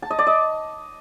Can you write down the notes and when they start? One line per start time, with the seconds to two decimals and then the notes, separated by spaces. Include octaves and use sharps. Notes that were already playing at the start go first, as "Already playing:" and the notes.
0.02 A5
0.10 D#5
0.19 D5
0.27 D#5